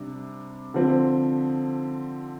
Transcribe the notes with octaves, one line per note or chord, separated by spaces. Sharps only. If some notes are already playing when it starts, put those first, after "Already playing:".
Already playing: C3 G3 D4
D3 F3 C4